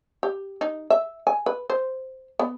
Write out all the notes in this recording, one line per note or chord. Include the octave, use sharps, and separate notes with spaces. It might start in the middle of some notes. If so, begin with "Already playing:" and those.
G4
D#4
E5
G#5
B4
C5
B3